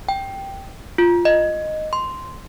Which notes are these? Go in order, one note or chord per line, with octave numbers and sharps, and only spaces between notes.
G5
F4
D#5
C6